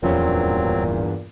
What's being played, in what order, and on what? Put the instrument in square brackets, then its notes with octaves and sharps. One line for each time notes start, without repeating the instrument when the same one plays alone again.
[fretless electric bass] D1 F3 C#4 [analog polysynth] E2 G2 [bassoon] A#2 [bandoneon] F#3 C4